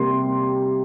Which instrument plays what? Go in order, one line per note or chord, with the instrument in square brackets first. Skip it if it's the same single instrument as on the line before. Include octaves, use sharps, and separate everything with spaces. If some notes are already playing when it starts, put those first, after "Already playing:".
Already playing: [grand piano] C3 G3 A#3 C6